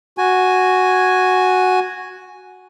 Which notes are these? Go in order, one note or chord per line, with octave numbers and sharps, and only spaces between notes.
F#4 G#5